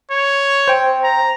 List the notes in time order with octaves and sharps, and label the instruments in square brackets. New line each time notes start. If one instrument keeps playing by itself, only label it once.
[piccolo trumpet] C#5
[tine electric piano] C5 G5
[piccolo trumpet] A#5